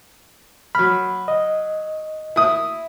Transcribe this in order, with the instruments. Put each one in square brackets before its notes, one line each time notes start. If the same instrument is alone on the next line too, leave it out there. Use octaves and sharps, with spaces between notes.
[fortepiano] F#3 F6 [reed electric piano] B5
[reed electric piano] D#5
[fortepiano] E4 D#6